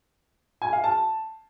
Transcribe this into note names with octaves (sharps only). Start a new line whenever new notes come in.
G#5
F5
A5